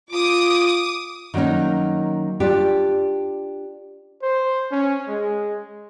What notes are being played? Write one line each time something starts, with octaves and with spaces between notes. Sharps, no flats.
F4 D6 D#6
D#3 F#3 A#3 C#4 D#4
D4 F4 G4
C5
C#4
G#3